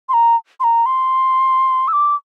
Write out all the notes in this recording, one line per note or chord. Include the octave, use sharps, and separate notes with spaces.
C6
A#5
C6
A#5
C6
E6
D6